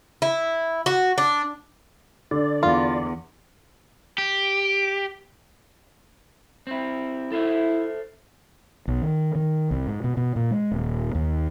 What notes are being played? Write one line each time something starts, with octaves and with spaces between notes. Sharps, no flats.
E4
F#4
D4
D3 D5
E2 F4
G4
C4 E4
E4 A4 C5 E5
B1
D#3
D#3
C2
G#2
B2
B2
A#2
G#3
D#1
D#2